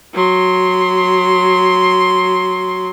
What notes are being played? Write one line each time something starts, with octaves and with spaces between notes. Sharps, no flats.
F#3 C6